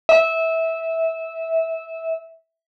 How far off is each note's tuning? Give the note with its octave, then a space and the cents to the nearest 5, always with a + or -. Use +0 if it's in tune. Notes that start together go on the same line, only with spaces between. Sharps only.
E5 -15